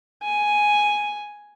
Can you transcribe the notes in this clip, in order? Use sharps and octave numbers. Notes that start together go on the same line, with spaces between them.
G#5